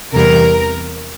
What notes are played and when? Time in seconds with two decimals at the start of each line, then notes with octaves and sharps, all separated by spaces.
0.14 E2 C3 E3 G3 A#4